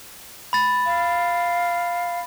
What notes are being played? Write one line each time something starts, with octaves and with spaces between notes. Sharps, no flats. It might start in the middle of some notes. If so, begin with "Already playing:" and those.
B5 A6
F5